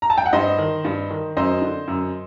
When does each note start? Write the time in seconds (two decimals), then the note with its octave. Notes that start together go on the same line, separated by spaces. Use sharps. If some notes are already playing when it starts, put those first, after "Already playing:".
0.02 A#5
0.10 A5
0.18 G5
0.26 F#5
0.33 G2 C5 D#5
0.58 D#3
0.85 G2
1.11 D#3
1.37 F#2 C5 D#5
1.62 D3
1.88 F#2